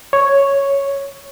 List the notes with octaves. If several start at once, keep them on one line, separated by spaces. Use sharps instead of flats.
C#5